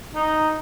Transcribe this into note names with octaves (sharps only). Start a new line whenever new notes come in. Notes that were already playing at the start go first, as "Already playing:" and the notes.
D#4